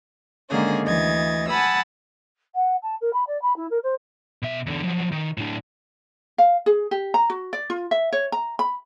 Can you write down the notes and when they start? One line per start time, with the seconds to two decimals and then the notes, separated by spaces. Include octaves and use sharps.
0.50 D3 D#3 G#3 A#3 C#4 G#4
0.84 D2 E3 D#5 G#6 A6
1.49 F#5 G#5 A5 B5 D#6 E6
2.55 F#5
2.82 A5
3.01 A#4
3.13 B5
3.27 D5
3.42 B5
3.56 E4
3.70 A#4
3.83 C5
4.42 B2 E5
4.67 E2 D3
4.83 F3 F#3
5.12 D#3
5.38 A2 D4
6.38 F5
6.66 G#4
6.91 G4
7.14 A#5
7.30 F#4
7.53 D5
7.70 F4
7.91 E5
8.13 C#5
8.32 A#5
8.59 B5